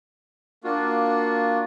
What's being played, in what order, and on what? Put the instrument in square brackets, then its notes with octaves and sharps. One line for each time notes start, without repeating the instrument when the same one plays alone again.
[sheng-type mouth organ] A#3 D4 F4 F#4